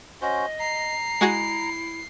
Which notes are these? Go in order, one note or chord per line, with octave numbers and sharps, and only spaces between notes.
C#4 F#4 C5 D#5
A#5 C7
G#3 E4 F#4 G#4